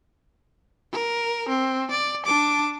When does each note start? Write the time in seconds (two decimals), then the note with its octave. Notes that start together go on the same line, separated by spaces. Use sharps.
0.93 A#4
1.49 C4
1.91 D5
2.26 D4 D6